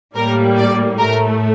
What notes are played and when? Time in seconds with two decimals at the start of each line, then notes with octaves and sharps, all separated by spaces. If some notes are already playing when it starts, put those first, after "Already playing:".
0.15 A2 G3 A#3 A#4
0.57 D5
0.99 A2 A3 A#4